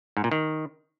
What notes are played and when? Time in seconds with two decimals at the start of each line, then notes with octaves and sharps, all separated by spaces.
0.17 G#2
0.24 A#2
0.32 D#3